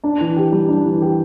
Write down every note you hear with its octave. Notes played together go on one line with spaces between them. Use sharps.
D4
E3
G4
G3
D4
E3
G4